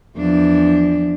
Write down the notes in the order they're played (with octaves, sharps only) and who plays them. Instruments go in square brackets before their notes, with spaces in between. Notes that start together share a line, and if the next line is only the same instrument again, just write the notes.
[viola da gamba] E2 F3 D4